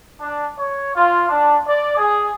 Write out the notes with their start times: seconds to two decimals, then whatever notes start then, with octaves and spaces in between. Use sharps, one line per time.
0.20 D4
0.57 C#5
0.95 F4
1.29 D4
1.68 D5
1.97 G#4